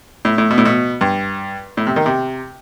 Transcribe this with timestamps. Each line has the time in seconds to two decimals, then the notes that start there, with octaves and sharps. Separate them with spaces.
0.25 A2
0.38 A2
0.50 B2
0.58 A2
0.65 B2
1.01 G2
1.77 A2
1.87 C3
1.96 D#3
2.06 C3